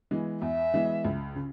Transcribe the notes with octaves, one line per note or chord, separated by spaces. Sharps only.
E3 G#3 B3
E2 E5
E3 G#3 B3
C#2
C#3